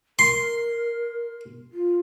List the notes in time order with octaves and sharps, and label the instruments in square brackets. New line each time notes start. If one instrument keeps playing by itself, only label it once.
[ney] A#4 [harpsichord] C6
[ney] F4